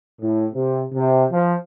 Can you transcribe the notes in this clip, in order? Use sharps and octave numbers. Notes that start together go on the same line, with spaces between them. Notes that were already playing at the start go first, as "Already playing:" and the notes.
A2
C3
C3
F3